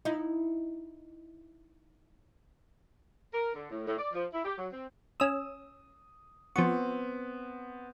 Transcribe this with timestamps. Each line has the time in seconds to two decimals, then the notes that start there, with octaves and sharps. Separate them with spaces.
0.05 D#4 E4
3.32 A#4
3.54 D3
3.70 A2
3.85 A2
3.98 D5
4.13 F3
4.32 E4
4.44 G4
4.57 F#3
4.72 C4
5.20 C#4 D#6 E6
6.56 F3 B3 C4 C#6